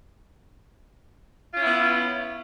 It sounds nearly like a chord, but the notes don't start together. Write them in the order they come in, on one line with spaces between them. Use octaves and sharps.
F4 C#4 E4 B3